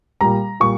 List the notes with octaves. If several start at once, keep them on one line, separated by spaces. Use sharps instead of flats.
A#2 G3 A#5
A#2 G3 C#6